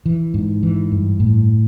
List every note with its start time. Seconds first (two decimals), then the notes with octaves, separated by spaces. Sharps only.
0.06 E3
0.34 G#2
0.63 E3
0.92 G2
1.20 A2